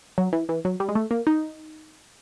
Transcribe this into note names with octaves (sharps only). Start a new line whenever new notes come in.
F#3
E3
E3
F#3
G3
G#3
A3
A#3
D#4